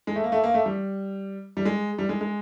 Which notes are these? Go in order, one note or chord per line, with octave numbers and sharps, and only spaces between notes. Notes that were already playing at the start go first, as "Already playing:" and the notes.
G#3
A3
A#3
A3
A#3
A3
G3
G3
G#3
G3
G#3
G#3